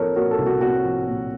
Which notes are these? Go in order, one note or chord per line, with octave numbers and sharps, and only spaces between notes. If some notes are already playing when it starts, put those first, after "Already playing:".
Already playing: F3 C4 A4 A#4 C#5
A#2 F#4 A#4
A4
C2
F#4
C4 F#4
F3
A#2